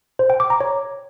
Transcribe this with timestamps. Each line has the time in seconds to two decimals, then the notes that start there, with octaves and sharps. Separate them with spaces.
0.19 C5
0.30 G5
0.40 D6
0.50 A#5
0.61 C#5